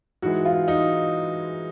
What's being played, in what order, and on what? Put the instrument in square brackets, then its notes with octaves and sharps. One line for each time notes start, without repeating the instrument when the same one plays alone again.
[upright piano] G#2 E3 G#3 F#4
F4
D#4